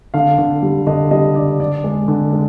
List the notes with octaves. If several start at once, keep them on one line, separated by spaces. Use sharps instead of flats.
D3 F5
D3
G3
D3 D#5
G3 D#5
D3 D5
D3 D5
G#3
D3
G#3